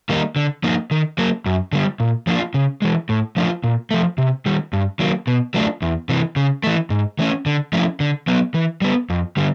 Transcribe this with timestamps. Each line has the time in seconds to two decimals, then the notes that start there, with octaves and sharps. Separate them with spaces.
0.09 D#3 G3 A#3 D#4
0.36 D3
0.63 F3 A#3 D#4
0.91 D#3
1.18 F#3 A#3
1.46 F#2
1.72 D3 G3
2.00 A#2
2.27 F3 A#3 D4 F4
2.54 C#3
2.82 E3 G#3
3.09 A2
3.37 F3 A3 D4 F4
3.64 A#2
3.91 F3 A3
4.18 C3
4.46 D#3 G3
4.73 G2
4.99 D#3 F#3 A#3
5.27 B2
5.54 F#3 A3 D4 F4
5.82 E2
6.09 C3 E3
6.36 C#3
6.63 E3 A3
6.90 G#2
7.19 E3 A3 C#4
7.46 D3
7.73 F3 A3 C#4 E4
8.00 D3
8.27 F#3 B3
8.54 E3
8.81 G3 B3
9.10 F2
9.37 D3 G3